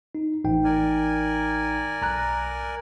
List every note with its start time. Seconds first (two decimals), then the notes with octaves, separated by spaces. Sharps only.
0.15 D#4
0.44 A1 D#4 G5
0.64 A#4 D5 G#5
2.02 B1 A#5 F#6